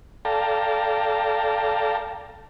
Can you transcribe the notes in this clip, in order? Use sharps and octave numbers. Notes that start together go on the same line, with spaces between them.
A4 D5 F5 G5 A5 A#5